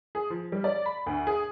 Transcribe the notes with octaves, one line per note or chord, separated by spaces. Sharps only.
G#4
F3
G3
D5
B5
D2
G#4